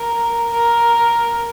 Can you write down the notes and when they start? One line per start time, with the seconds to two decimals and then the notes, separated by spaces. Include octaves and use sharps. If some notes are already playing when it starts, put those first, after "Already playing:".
Already playing: A#4
0.52 A#4